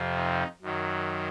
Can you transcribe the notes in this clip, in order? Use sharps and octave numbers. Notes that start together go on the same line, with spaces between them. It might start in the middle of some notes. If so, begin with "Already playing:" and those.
Already playing: F2 C3 F3
D#4
F#2 D#3 F#3